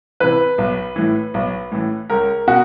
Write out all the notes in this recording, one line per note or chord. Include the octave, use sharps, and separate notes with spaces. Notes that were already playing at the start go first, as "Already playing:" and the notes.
C3 E3 B4
B1
A2 E3
B1
A2 E3
C#2 A#4
B2 F#4